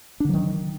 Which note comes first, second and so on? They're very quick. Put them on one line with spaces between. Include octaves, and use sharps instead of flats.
D4 D3 F#3 D#3